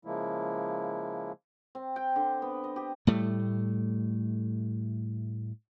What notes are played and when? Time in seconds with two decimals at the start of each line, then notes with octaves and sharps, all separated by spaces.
0.05 C#3 F3 G#3 A#3 E4
1.75 C4
1.96 G5
2.16 D3
2.42 B3
2.64 D#5
2.76 G4
3.07 A2 G3 A3